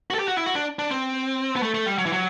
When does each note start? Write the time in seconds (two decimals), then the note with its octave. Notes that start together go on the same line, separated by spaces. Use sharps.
0.10 F#4
0.15 A4
0.19 G4
0.28 F#4
0.37 E4
0.46 F#4
0.55 D4
0.79 D4
0.91 C4
1.56 B3
1.62 A3
1.74 A3
1.86 G3
1.98 F#3
2.06 E3
2.13 F#3